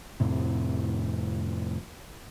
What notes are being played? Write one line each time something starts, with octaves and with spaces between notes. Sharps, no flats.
F2 A2 C3